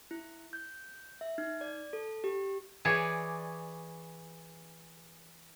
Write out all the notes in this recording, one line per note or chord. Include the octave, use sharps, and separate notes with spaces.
E4
G6
E5
D#4
D5
A4
G4
E3 G#4 C#5 D5